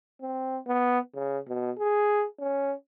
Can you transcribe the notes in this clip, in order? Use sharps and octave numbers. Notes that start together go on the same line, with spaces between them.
C4
B3
C#3
B2
G#4
C#4